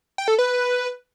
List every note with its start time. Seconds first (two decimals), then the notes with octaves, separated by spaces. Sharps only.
0.18 G5
0.28 A4
0.39 B4